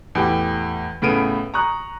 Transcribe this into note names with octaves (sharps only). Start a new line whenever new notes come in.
E2 A2 G4
A2 C#3 B3 D7 D#7
A#5 C#6 D#6 F#6